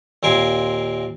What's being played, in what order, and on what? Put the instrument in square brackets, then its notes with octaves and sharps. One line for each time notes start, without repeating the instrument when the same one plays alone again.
[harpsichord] D#2 A#2 C4 A#4 G#5 C6